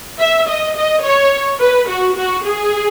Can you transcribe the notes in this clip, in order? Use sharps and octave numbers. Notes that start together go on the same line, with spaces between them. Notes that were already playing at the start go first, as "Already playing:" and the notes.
E5
D#5
D#5
C#5
B4
F#4
F#4
G#4